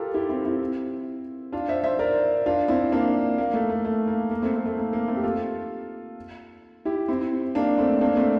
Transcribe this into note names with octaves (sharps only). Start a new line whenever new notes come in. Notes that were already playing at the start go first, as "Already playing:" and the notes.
Already playing: F4 G4 A4 A#4
E4 G4
C4 E4
C4 E4
D4 F4
C5 E5
C5 E5
A#4 D5
D4 F4
C4 E4
A#3 D4
A#3
A3
A3
A3
A#3
A#3
A3 C4
A3 C4
A3
A#3
A#3
A3 C4
G4
F4 A4
E4 G4
C4 E4
A#3 D4
A3 C4
A#3 D4
A3 C4